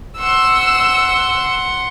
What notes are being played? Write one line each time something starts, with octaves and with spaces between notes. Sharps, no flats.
F#5 C6 E6